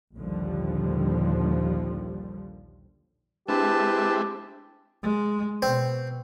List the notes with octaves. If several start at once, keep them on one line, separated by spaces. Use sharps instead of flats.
A#1 D#2 D3 F3 G3
G#3 C4 D4 E4 G4 B4 A5
G#3
B2 C4